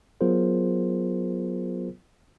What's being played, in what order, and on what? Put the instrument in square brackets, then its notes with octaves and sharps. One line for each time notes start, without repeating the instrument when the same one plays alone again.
[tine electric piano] F#3 B3 F4 G#4 A#4 C5